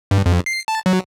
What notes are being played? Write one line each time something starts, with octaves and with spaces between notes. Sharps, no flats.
G2
F2
C7
A5
F#3